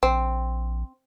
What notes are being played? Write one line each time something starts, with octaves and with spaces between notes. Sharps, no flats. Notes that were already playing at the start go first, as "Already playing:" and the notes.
A#1 C4